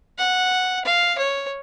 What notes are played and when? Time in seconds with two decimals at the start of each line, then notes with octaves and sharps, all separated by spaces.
0.19 F#5
0.86 F5
1.18 C#5